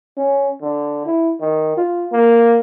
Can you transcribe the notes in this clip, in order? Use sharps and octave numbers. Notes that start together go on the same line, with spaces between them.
C#4
D3
E4
D#3
F4
A#3